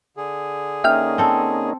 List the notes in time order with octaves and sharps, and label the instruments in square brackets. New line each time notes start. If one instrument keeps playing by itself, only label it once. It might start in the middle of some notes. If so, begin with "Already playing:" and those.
[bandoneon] D3 G#4
[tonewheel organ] A#3 C#4 D#4 [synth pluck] E5 G5 F6
[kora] C4 A4